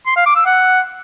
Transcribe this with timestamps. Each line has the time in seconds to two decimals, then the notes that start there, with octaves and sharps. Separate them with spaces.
0.07 C6
0.16 F5
0.26 D6
0.36 E6
0.46 F#5